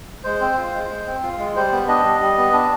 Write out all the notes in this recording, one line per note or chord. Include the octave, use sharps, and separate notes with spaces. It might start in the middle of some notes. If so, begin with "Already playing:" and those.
G#3 C5
C4
F4
G#3
G#3
C4
F4
G#3
G3 C5
B3
D4 D#5
G3
G3
B3
D4